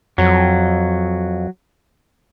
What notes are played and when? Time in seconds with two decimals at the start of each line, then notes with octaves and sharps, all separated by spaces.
0.18 F2 F#3